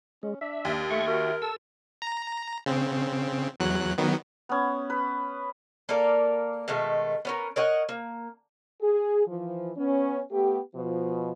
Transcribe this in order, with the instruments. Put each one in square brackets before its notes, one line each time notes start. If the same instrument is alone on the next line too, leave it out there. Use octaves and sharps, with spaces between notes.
[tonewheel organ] G#3 [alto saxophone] C#4
[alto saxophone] D4 [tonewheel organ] E5
[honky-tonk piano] D#2
[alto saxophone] A3 [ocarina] E5 [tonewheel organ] C#6
[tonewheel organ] F#4 [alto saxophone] A#4
[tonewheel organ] A4 E6 [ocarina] A5
[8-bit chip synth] A#5
C#3 C4
E2 F#3 F#6
D#3 F#3 B3
[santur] B3 C#4
B4
[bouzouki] A#3 A4 A#4 D5
B2 D#3 G#3 A3
B3 C#4 A#4
A#4 C#5 D#5 F#5
A#3
[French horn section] G#4
E3 F3
B3 C#4
A3 B3 G4
B2 F3